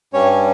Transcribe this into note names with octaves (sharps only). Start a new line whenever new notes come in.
G2 G3 C#4 C#5